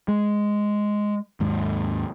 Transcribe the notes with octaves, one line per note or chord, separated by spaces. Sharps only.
G#3
D#2 G#2